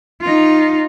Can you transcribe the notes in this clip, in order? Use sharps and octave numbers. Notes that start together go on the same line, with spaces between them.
D#4 F4